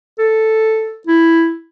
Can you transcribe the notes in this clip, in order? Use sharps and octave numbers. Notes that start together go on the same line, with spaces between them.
A4
E4